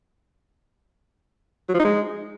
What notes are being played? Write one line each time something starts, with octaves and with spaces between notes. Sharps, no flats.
F#3
F3
D#4
G#3